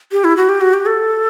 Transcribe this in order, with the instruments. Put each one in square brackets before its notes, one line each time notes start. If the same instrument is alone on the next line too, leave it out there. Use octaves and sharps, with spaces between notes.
[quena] G4
E4
F#4
G4
F#4
G4
A4